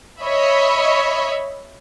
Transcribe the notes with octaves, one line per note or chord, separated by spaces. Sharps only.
C#5 D#5 E5 B5